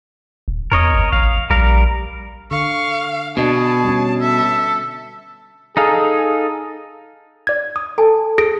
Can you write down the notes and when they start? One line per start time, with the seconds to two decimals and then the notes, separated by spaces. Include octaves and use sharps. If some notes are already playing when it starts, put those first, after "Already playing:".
0.48 D1
0.72 E2 A#4 C#5 D#5
0.94 G1
1.12 A1 F5
1.50 A#1 G3 A#4 F5
2.51 D3 F5 C#6
3.37 B2 D4 G#4 D#5 A5
3.84 G3 C#4
4.21 A4 E5
5.77 D#4 G#4 A4 F5
7.47 D5 G#6
7.76 D#6
7.98 A4 G#5 A5
8.38 G#4 A#6 D7